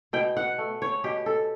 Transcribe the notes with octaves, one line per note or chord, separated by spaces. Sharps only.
B2 G5
F#5
A3
C#5
B2 G4
A4